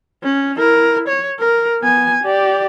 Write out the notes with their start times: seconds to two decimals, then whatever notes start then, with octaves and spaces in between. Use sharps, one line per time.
0.23 C#4
0.58 E4 A#4
1.08 C#5
1.39 A#4
1.81 B3 G#5
2.23 G4 D5